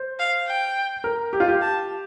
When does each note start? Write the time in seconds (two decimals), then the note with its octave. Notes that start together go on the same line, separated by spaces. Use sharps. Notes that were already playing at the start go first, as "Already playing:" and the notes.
Already playing: C5
0.19 F5
0.47 G5
1.04 A#4
1.33 G4
1.40 F4
1.48 G4
1.62 A5